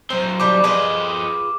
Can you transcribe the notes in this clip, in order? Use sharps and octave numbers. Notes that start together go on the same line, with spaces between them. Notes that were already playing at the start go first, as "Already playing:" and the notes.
F#3 C4 C5
G3 D4 D6
F3 F4 G#4 B4 D#5